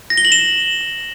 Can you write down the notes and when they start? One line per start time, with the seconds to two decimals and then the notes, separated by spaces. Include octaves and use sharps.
0.10 A#6
0.17 G7
0.25 F#7
0.32 E7